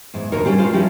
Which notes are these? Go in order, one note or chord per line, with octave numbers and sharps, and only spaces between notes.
E2 G#2
D#2 G#2 B2 D3 A#4 C#5
C#3 G3 B3 C#4 G4 G#4
G#3 C#4 F4 C5 F5
F3 G3 C#4 D#4 E4 G4